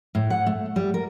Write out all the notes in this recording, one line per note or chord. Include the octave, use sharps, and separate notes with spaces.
A2
F#5
A3
G3
A#4